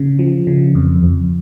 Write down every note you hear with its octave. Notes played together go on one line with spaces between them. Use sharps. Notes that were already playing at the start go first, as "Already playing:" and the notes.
Already playing: C#3
F3
C#3
F2
F2